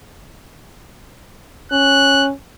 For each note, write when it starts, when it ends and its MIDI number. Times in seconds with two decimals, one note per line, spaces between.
1.72 2.31 61
1.72 2.26 90